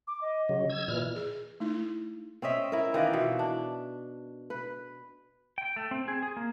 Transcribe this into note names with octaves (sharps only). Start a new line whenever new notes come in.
D6
D#5
C#3 F#3
E6 G#6
A#2 E3 D5 F6
G#4
A3 D#4 E4
C4 C#4 D#5 E5
E4 A#4
D#3 E3 F4 D5
B2 E5
D4
B4
G5
A3
C4
G#4
G#4
A#3